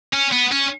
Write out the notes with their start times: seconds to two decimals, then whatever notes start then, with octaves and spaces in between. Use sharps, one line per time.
0.13 C#4
0.32 B3
0.51 C#4